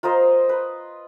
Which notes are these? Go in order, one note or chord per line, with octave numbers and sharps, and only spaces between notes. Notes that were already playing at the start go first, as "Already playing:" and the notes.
F4 A#4 C5 D#5
B4